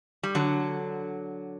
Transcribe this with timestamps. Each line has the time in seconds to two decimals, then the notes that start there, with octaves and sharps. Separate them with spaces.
0.23 G3
0.35 D3 F#3